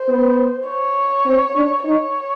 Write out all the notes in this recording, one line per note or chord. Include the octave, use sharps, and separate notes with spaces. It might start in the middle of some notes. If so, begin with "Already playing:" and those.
Already playing: C5
B3
C#5
C4
D4
D#4 C#5